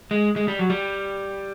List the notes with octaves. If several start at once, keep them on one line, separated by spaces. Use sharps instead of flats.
G#3
G#3
G3
F#3
G3